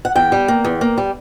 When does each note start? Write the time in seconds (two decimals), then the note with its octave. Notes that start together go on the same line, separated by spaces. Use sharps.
0.05 F#5
0.16 E2 G5
0.32 G3
0.48 A#3
0.65 E2
0.81 A#3
0.98 G3